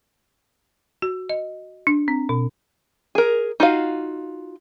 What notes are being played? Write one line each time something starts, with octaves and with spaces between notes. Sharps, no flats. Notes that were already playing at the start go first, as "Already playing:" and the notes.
F#4
D#5
D4
C4
B2
G#4 A#4
D#4 F4 F#4 F5